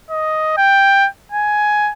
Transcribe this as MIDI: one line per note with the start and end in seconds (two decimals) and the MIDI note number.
0.11 0.57 75
0.58 1.08 79
1.32 1.92 80